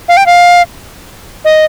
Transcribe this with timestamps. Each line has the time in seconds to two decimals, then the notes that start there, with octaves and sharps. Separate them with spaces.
0.09 F5
0.17 G5
0.26 F5
1.45 D#5